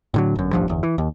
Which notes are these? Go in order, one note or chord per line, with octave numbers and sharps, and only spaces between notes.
A2 D3 F#3
G1 F#2
E1 A1 G2 F3
G1 E2
E3
D#2